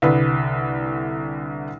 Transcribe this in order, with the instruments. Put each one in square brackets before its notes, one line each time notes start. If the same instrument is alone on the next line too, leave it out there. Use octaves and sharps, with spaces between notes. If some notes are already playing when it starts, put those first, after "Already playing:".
[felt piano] C2 D3 B4